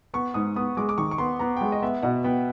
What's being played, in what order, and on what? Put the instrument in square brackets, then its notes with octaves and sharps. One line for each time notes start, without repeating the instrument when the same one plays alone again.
[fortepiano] B3 [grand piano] C#6
[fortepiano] G#2 [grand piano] D#6
[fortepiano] B3 [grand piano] D#6
[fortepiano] G#3 [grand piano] D6
[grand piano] D6
[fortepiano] D#3 [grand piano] C#6
[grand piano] C#6
[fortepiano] B3 [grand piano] C6
[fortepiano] B3 [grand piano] A#5
[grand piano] G5
[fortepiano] G#3 [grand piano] F#5
[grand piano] D#5
[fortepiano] B3 [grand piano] E5
[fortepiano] B2 [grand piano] F#5
[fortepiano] B3 [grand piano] G5